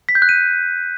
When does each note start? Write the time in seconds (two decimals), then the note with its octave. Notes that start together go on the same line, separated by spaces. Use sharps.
0.09 B6
0.15 G6
0.22 F#6
0.29 D#7